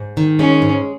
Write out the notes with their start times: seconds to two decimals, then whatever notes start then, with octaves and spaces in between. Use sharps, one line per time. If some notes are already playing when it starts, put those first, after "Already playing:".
Already playing: G#2
0.17 D#3
0.39 G#3 C#4
0.62 G#2